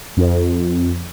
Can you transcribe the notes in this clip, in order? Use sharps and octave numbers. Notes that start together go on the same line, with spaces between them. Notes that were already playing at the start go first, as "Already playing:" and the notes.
F2